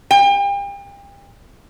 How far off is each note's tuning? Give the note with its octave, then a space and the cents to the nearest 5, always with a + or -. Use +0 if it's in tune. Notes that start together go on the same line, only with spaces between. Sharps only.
G5 +40